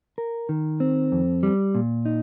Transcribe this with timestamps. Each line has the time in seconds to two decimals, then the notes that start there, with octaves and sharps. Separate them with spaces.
0.18 A#4
0.49 D#3
0.80 C4
1.12 F2
1.43 G3
1.75 A#2
2.05 D#4